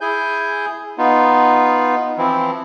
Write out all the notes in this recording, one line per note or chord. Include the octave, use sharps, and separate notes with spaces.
E4 G#4 G#5 G6
B3 D#4 F4
E3 F3 C4 E4